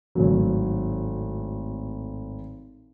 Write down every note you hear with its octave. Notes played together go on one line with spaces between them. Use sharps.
G#1 A2 F#3